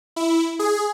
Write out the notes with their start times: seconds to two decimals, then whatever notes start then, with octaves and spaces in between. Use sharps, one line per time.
0.16 E4
0.59 G#4